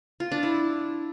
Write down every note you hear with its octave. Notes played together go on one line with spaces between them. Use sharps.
F4
D4
E4